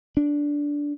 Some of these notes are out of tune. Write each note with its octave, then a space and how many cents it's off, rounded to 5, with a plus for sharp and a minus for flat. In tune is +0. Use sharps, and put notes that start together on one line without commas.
D4 -10